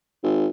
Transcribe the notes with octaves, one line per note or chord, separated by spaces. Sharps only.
G#1